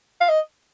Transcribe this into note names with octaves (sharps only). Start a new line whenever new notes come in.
F5
D#5